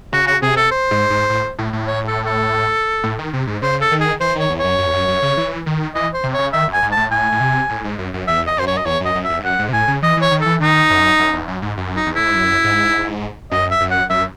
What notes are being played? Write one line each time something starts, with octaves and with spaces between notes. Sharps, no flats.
C#3 F#4
F#4
C3 G#4
A4
C5
G#2
G#2
A2
A2
A2
C#5
A4
A4
A2
D#3
C3
G#2
C#3 C5
A4
D#3
G#4
E3 C5
D#3 C#5
E2
F#2 C#5
F#2
E2
F#2
F#2
C#3
E3
D#3
E3 D#5
C5
C3
C#3 C#5
D#3 E5
F#2
G#5
G#2
A2 A5
A2 G#5
A2
C3
A2
G#2
F#2
F#2
E2 E5
D#5
F#2 C5
C#5
D#5
E2 C#5
F#2 D#5
F#2
E5
E2
G#2
F#2 F#5
G#2
C3
A2 G#5
C#3
E3 D#5
E3 C#5
D#3
E3 A4
D#3 D#4
F#2
F#2
E2
F#2
G#2
F#2
D#4
E2
A2 E4
G#2
F#2
G#2
F#2 D#5
E5
F#2
F#5
F#2 E5